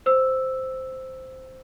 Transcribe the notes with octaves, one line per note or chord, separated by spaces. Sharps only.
C5 E6